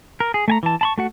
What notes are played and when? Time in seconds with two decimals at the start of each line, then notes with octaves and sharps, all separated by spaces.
0.20 A#4
0.34 G#4
0.48 A3 G#5 A#5
0.63 E3 A5
0.81 A5 B5 C#6
0.98 A3 F#4 F#5